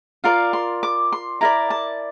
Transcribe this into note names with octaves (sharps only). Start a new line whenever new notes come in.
F4 A#4 D5 F5
C6
D6
C6
E4 A#4 D5 A#5
A5